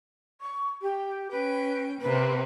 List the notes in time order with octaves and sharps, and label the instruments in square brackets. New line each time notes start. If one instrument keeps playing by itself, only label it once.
[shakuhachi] C#6
G4
[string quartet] C#4 G5 [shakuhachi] B4
[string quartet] C3 A#3 C4 [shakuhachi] B4